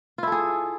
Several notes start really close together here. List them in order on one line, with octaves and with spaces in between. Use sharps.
F4 E4 A4 G#4